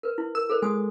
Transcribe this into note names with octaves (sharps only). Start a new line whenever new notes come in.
A#4 B4
E4
A#4 E6
A4 A#4 C5
G#3 G#5 D#6